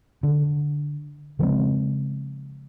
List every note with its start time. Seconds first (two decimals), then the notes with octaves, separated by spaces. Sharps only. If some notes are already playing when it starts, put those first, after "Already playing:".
0.23 D3
1.39 C#3 F3 G#3 C4